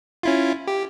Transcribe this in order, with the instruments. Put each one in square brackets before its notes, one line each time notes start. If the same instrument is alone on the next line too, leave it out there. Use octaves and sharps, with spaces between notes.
[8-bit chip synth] C#4 E4 F4
G4